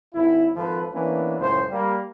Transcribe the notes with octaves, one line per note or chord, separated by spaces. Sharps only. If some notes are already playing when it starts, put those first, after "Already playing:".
G#1 D#2 E4
G#1 F3 A4 B4
E3 A#3 B3 C#4 D4
C#2 F#2 A2 C5
G3 A#3